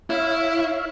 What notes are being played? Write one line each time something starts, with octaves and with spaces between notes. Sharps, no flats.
E4 C#5 E5 F5